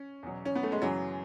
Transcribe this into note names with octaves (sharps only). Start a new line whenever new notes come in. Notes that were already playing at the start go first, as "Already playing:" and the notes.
Already playing: C#4
E2 B2 F#3
C#4
B3
A3
G#3
F#2 C#3 E3 F#3